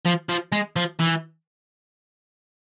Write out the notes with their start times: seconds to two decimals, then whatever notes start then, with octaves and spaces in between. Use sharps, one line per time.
0.05 F3
0.29 F3
0.52 G#3
0.76 F3
1.00 E3